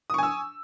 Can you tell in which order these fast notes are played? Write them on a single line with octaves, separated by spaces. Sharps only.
D#6 C#6 G#5 E6